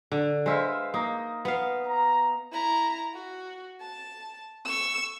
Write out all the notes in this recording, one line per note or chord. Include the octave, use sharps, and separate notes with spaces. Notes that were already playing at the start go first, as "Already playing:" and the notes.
D3
G#3 B4 C5 E5 F5
A#3 D#4
B3 F5
A#5
E4 A#5
F#4
A5
C#6 E6